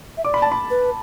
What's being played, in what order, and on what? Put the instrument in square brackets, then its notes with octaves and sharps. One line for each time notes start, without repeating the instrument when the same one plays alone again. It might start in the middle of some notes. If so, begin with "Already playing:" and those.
[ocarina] E5
[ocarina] D5 [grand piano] D6
[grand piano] B5
A5
B5
[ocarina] B4